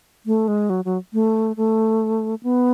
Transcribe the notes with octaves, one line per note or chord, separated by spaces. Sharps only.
A3
G#3
F#3
F#3
A3
A3
B3